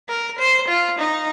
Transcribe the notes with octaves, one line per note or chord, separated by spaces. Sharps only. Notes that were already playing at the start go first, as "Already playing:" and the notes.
A#4
C5
F4
D#4